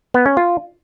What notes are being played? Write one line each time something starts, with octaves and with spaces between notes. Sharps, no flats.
B3
C#4
F4